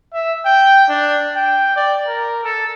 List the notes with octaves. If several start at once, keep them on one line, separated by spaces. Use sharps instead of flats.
E5
G5
D4
G5
D5
A#4
A4